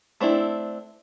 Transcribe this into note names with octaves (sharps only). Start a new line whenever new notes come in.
A3 C4 D4 E4